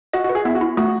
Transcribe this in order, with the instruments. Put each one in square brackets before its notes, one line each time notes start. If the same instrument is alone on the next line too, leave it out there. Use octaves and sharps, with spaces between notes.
[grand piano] F#4 [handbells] D#5
[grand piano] F#4
[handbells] B4
[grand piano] G#4
[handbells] B3 [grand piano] E4
[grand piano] F#4
[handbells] E4
[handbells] A3 [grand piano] F#4